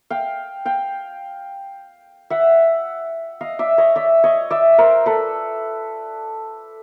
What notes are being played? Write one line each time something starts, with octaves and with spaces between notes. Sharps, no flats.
F5 G5
F5 G5
E5 F#5
D#5 F5
D5 E5
C#5 D#5
D5 E5
C#5 D#5
D5 E5
A#4 C5
A4 B4